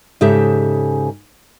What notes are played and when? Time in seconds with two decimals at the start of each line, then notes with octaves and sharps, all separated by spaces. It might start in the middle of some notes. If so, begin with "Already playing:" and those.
0.21 G#2 C#3 G4 A4 E5